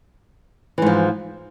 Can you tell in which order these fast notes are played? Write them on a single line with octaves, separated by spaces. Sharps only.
E3 G#2 F3